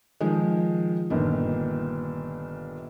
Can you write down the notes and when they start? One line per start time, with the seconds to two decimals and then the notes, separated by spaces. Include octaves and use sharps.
0.21 D#3 F3 G#3
1.10 G1 A#2 D#3